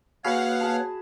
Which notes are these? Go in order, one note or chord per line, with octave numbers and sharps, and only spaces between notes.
A#3 F#4 G#4 B4 C#5 F5 F#5 B5
G#4 A5